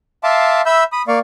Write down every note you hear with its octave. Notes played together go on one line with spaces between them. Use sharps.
E5 F5 A5 C6 D6
E5 B5 E6 G6
B5 D#6
A#3 D5 F5 C#6